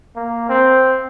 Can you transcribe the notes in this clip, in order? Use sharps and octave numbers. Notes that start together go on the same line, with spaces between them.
A#3
C4